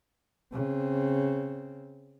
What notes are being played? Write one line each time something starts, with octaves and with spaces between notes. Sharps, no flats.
C#3 C4